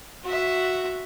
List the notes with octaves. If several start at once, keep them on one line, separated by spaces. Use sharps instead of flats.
F#4 E5